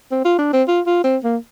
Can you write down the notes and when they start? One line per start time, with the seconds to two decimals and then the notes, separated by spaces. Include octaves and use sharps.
0.11 C4
0.25 F4
0.39 D4
0.53 C4
0.68 F4
0.86 F4
1.04 C4
1.24 A#3